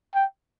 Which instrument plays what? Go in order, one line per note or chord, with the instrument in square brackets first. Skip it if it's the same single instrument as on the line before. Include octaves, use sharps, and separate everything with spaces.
[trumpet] G5